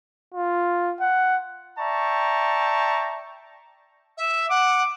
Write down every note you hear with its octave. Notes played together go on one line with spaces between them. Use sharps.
F4
F#5
D5 E5 G5 A5 A#5 C#6
E5
F#5 D6